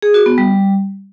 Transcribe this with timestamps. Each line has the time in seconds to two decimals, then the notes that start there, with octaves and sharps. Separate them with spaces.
0.02 G#4
0.14 F#4
0.26 B3
0.38 G3